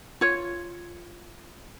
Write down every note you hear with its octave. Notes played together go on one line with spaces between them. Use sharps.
F4 C#5